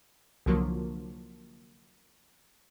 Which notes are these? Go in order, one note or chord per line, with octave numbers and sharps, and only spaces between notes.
C2 D3 F3 F#3 A#3